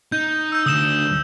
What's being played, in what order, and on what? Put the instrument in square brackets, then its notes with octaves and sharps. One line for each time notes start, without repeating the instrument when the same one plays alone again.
[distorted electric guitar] D#4 [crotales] G6
[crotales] E6 G6
[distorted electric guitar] D2 D3 [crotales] D#6 E7